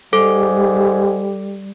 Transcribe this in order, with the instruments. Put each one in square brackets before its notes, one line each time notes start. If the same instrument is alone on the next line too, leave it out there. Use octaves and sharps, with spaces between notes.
[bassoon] G#2 [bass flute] G3 [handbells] A4 D6